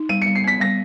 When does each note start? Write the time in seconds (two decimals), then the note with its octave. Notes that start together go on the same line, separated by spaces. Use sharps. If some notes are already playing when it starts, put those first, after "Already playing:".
Already playing: D#4
0.09 G3 D#7
0.22 C#7
0.26 G3
0.35 C7
0.44 B3 B6
0.61 G3 A#6